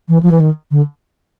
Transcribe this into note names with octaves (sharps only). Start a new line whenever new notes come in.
E3
F3
E3
D#3
D3